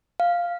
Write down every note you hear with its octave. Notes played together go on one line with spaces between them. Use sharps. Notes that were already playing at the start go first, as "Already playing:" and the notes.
F5